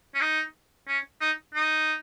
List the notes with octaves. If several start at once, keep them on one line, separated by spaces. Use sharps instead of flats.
C#4
D#4
C#4
D#4
D#4